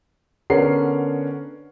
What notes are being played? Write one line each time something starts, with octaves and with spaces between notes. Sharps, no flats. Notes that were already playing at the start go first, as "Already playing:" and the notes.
D3 B3 C#4 A#4 F#5 C7